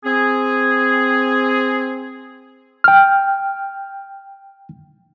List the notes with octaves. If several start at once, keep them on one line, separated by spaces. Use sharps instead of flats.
C4 G#4
G5 F6